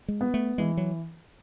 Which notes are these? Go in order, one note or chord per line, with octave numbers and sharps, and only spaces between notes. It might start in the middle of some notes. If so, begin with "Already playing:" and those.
G#3
B3
A3
E3 G#3
F#3